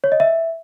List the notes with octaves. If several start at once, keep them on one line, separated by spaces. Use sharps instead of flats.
C#5
D#5
E5